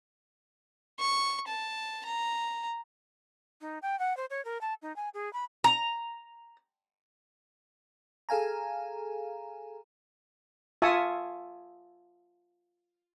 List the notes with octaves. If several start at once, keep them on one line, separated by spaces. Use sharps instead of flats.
C#6
A5
A#5
D#4
G5
F#5
C5
C#5
A#4
A5
D#4
G#5
G#4
B5
A#5
G#4 A4 F5 G#5 A#5
F4 E5 G#5 A5 C#6 D#6